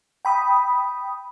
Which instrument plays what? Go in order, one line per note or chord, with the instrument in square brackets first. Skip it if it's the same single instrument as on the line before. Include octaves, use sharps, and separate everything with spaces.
[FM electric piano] G5 B5 D#6